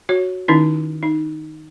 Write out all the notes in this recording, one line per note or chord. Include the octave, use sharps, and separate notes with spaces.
F#4 C#5
D#3 C#4 D#4 E4
D#4